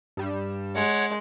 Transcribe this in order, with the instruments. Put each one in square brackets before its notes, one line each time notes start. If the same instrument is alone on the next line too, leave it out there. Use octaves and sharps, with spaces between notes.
[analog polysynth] G2 G3 E7
[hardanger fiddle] G#3 [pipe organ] C#5 F#5